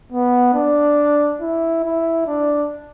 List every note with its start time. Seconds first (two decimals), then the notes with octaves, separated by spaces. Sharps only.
0.12 B3
0.54 D4
1.41 E4
1.84 E4
2.27 D4